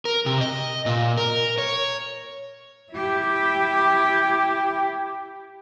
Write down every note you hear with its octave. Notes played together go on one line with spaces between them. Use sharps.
A#4
C3
D#5
A#2
A#4
C#5
E4 G4